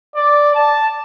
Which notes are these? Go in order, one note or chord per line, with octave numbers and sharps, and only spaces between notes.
D5
A5